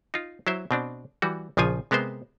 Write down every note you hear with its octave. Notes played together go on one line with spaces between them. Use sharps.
D#4 F4
F#3 E4 C5 E5
B2 C4 D4
E3 G3 F#4
A#1 C#3 F3 F4 G#5
C3 G#3 B3 A#4 C5